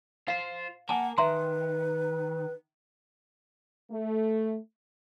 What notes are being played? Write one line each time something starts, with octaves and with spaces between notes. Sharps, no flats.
F4 C5 F5
A#3 F#5 G#5 A5
D#3 B4 E5 A#5 C6
A3